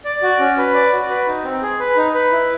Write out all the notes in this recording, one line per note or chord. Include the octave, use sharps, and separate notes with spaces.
D5
F#4
C#4
B4
D5
F#4
B4
D#4
C4
G#4
B4
D#4
B4
E4